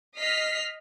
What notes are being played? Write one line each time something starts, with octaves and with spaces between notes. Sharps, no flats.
D#5 F6 B6 C7